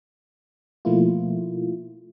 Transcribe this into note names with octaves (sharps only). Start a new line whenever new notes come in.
B2 F3 A3 A#3 E4 F4